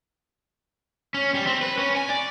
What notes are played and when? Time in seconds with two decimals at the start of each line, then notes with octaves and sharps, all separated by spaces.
1.14 C#4
1.34 G3
1.47 C4
1.62 B4
1.78 C#4
1.96 G#5
2.09 D5